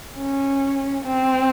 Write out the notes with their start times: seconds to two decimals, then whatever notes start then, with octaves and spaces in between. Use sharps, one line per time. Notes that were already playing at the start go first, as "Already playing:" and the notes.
0.17 C#4
1.04 C4